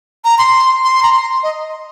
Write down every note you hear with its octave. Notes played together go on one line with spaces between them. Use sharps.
A#5
C6
C6
A#5
C6
D#5